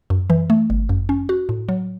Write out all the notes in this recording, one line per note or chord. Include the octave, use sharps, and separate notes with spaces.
F#2
E3
A3
G1
F#2
C#4
F#4
A2
F#3